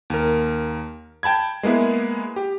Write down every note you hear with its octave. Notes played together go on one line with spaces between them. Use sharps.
D#2 A#4
G5 A5 B5 G#6
G#3 A#3 B3 E4 G#4
G4